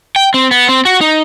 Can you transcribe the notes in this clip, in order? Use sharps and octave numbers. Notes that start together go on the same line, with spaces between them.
G5
C4
B3
C4
F#4
D#4